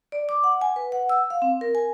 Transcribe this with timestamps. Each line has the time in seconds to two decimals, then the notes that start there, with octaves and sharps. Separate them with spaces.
0.12 D5
0.29 D6
0.44 F#5
0.61 G#5
0.76 B4
0.92 F#5
1.09 E6
1.30 F5
1.42 C4
1.61 A#4
1.75 G#5